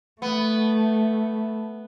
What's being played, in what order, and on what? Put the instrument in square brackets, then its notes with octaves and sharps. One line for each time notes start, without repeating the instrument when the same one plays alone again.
[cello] A3 [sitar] B3